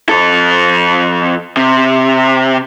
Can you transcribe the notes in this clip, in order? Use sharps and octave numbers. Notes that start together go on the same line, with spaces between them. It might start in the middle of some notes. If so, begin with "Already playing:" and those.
F2 A4
C3